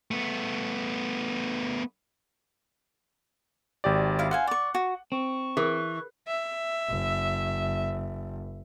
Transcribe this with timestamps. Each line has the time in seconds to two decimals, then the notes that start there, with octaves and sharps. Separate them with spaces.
0.11 A3 B3
3.84 G#1 G4 D5
4.19 E4 F5
4.31 C5 F5 F#5 G#5
4.47 D5 C#6
4.75 F#4
5.12 C4 C#6
5.57 E3 G#4 A#4
6.28 E5
6.89 F#1